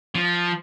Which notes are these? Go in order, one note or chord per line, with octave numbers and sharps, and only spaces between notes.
F3